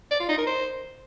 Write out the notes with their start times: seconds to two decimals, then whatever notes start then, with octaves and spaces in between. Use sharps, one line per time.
0.11 D5
0.20 F4
0.29 D#4
0.38 A#4
0.46 C5